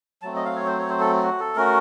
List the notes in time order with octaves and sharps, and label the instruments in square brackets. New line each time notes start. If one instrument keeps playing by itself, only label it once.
[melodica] F#3 A3 C4 A5
D#5
F5
C#5
C5
C#5
C5
A4
F#4
A4
A3 C#4 F#4 A#4